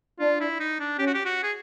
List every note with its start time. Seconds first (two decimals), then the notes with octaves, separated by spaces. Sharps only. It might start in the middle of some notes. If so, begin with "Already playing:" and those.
0.19 D4 F4
0.40 E4
0.60 D#4
0.80 D4
0.98 C#4 G4
1.07 F#4
1.14 G4
1.25 F#4
1.43 G#4